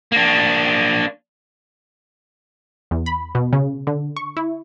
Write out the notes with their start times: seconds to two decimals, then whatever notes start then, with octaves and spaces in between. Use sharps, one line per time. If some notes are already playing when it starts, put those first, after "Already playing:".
0.12 A#3 D4
2.91 E2
3.06 B5
3.35 B2
3.53 C#3
3.87 D3
4.17 C#6
4.37 E4